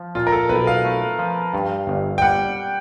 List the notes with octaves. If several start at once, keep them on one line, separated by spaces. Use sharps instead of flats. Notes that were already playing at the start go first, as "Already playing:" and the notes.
Already playing: F3
A#2 F4
A#4
A4
B1 B4
F5
A3
F3
G2
G1
G5
G3 F#5